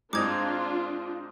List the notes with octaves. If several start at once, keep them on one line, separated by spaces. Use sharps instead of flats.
G#2 C4 D4 D#4 F4 D6 G#6